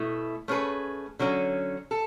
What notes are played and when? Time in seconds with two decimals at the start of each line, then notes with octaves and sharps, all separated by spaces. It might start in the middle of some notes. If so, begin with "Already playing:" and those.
Already playing: B2 A3 E4
0.48 A3 C#4 G#4 B4
1.19 D3 F#3 C#4
1.91 A4